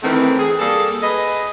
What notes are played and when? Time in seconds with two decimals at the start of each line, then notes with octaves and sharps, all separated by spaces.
0.02 D#3 E3 A3 C4
0.39 G#4
0.59 G3 A#3 G#4 A4
1.02 G#4 B4 D#5